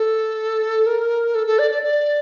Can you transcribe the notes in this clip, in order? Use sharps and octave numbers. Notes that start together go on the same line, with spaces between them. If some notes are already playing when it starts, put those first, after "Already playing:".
Already playing: A4
A#4
A4
A4
D5
D5
D5